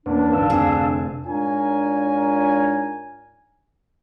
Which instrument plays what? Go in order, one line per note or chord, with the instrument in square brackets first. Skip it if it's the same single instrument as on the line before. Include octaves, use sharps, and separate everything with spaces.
[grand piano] E2 [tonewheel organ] A#3 C#4 B4 [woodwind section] D4
[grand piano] G1 D3 D#3 [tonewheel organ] F5 E6
[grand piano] F1 D3 C4 [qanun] G#4
[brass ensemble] G#2 D4 F4 A#4 C#5 G#5